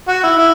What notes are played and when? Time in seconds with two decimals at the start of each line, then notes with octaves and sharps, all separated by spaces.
0.08 F#4
0.23 E4
0.38 E4